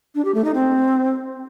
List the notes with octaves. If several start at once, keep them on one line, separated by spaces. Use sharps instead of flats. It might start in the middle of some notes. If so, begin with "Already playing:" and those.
D4
G4
A3
D#4
C4